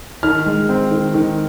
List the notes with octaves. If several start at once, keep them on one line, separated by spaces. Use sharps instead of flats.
D#3 F6
G#3
C4
D#3
D#3